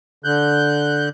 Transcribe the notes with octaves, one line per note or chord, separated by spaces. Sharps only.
D3 F#6 G6